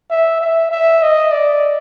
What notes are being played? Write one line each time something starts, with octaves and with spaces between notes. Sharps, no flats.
E5
E5
E5
D#5
D5